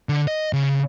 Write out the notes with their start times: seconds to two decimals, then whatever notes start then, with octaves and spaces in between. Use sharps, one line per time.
0.09 D3
0.27 D#5
0.53 C#3